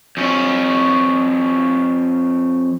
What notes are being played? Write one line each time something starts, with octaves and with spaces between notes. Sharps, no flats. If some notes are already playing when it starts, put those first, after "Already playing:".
F2 C#4